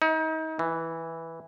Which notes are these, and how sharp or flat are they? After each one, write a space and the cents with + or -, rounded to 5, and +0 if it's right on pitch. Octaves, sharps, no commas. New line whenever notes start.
D#4 +35
E3 -5